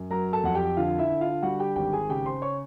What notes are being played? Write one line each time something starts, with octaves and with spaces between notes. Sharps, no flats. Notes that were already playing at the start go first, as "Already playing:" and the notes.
Already playing: F#2
F#3 A#4 A#5
A4 A5
F2 F#5
G4 G5
D3 F4 F5
E4 E5
D3
F4 F5
G3 F#4 F#5
G4 G5
G#1 G4 G5
G#4 G#5
C#3 G4 G5
C5 C6
C#5 C#6